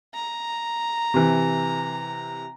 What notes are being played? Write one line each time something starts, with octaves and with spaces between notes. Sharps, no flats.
A#5
C3 E3